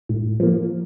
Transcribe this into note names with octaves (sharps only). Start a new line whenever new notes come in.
A2
F3 A#3